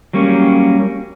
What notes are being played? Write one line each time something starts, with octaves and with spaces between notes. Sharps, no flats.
F#3 G3 A#3 C#4